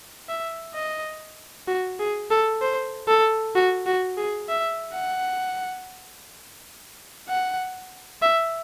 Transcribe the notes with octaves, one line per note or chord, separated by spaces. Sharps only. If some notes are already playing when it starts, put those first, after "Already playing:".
E5
D#5
F#4
G#4
A4
C5
A4
F#4
F#4
G#4
E5
F#5
F#5
E5